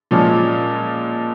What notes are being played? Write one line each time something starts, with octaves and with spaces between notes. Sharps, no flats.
A#2 F3 G#3 C#4